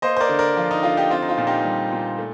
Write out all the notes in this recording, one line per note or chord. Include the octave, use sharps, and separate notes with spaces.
A#3 C5 D#5
C5
A#4 D5
D3
A#4 D5
F3 F4
D#4
D3 F4
D#4 G4
C4 F4
D#4
F4
A#2
D#4 G4
G3
A#2
A3